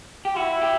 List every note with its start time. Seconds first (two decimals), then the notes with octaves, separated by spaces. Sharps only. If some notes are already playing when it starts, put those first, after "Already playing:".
0.25 G4
0.36 E4 F#4
0.62 G4